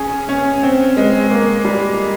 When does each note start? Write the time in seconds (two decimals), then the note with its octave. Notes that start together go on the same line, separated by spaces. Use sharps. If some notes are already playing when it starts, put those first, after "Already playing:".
Already playing: C#4 G#4
0.29 C#4
0.63 C4
0.97 G#3
1.31 A#3
1.65 G3